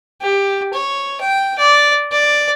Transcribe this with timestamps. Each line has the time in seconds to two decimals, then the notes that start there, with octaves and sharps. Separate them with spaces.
0.21 G4
0.73 C#5
1.21 G5
1.58 D5
2.12 D5